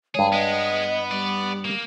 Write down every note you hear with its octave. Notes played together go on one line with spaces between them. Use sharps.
G2 G#3 G#4 C#5
G#3 B3 D#5
G3 D5
A#3